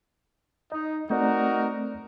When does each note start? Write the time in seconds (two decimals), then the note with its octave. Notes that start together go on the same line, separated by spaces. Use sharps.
0.72 D#4 D#5
1.10 A3 C4 D#4 F#4 A#4 D5